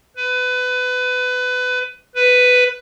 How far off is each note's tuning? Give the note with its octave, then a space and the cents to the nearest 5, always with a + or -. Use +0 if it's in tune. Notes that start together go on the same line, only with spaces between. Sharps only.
B4 +25
B4 +10